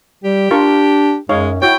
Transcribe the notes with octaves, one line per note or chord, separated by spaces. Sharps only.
G3 G4
D4 F4 A#4 C#6
F#2 G#3 D#4 C#5 F5
E4 F#4 C#5 G5